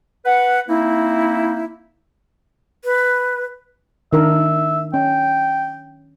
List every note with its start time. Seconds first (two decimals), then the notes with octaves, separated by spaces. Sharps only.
0.25 B4 F#5
0.68 A#3 C4 D#4 E4
2.85 B4
4.13 D#3 D4 A#4 E5
4.94 C#4 G5